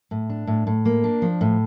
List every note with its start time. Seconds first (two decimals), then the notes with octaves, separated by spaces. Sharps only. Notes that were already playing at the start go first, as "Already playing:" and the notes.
0.11 A2
0.30 D4
0.47 A2
0.67 A2
0.85 A#3
1.04 D4
1.22 F3
1.41 A2